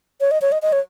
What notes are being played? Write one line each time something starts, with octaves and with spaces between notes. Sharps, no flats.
C#5
D#5
C#5
D#5
D#5
C#5